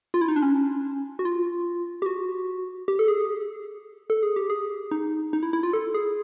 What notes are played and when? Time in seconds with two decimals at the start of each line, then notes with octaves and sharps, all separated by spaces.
0.14 F4
0.21 E4
0.28 D#4
0.36 D4
0.42 C#4
1.19 F#4
1.25 F4
2.02 G4
2.06 F#4
2.88 G4
2.99 A4
3.08 G#4
4.10 A4
4.23 G#4
4.36 G4
4.50 G#4
4.91 D#4
5.33 D#4
5.43 E4
5.53 E4
5.63 F4
5.73 A4
5.94 G#4